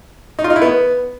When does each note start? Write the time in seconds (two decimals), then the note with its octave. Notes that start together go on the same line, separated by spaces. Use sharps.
0.39 D#4
0.44 F4
0.50 D#4
0.56 E4
0.62 B3